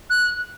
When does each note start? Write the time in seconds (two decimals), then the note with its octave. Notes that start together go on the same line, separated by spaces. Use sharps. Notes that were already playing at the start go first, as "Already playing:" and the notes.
0.10 F#6